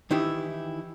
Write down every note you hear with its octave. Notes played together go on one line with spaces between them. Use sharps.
D#3 E3 D#4 E4 G4